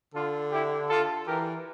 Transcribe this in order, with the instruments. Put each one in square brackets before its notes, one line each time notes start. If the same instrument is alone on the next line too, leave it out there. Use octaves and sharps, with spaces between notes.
[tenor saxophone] D3 [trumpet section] F4 A4
[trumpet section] E4 G4
F4 A4
[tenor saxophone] E3 [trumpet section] G4 A#4